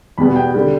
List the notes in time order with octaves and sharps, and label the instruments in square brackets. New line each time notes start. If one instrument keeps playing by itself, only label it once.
[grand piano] E2 B2 G3 B3 B5
G5
D3 G3